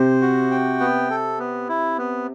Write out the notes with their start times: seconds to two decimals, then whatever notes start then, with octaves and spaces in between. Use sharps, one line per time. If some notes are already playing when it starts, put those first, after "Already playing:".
Already playing: C3 C5
0.21 F#4
0.51 G5
0.80 B3
1.10 A4
1.39 B3
1.69 E4
1.98 B3